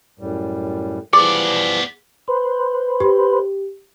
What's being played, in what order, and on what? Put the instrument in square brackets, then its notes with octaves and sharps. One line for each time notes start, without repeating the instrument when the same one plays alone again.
[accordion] F#2 A2 G3
[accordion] E3 F3 G3 [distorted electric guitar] B3 D5 [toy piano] G#4
[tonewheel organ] B4 C5
[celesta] G4